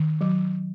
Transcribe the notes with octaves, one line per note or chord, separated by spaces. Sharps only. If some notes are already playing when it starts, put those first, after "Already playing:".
Already playing: D#3
F#3